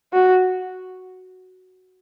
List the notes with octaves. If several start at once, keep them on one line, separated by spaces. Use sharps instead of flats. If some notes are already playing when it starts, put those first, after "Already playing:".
F#4